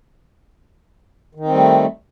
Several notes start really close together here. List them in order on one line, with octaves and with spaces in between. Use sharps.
D#3 D#4 C4 G3 A3